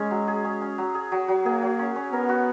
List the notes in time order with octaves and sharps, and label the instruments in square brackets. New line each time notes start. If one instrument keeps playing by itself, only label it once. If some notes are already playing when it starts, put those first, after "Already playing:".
Already playing: [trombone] G#3 [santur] C#4 G#4
[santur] F#3
G#4
C#4
C#4
F#3
G#4
F#3
F#3
[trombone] A#3 [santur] G#4
[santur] F#3
C#4
C#4
[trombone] B3 [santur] A#4
[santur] F#4